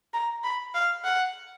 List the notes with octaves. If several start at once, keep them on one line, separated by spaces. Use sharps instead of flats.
A#5
B5
F5
F#5